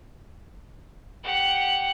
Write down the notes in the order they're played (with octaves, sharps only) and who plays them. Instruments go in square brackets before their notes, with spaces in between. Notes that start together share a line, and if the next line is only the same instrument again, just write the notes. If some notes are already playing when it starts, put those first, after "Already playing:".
[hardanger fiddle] G4 F#5